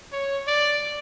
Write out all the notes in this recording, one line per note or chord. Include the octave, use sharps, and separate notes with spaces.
C#5
D5